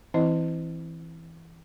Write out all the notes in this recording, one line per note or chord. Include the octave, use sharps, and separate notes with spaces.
E3 C4 E4 D#5